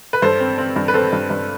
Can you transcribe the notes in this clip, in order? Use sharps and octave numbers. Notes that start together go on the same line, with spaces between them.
B4
G2 A4 C5
C4
C4
G2
B4
C4 A4 C5
G2
G2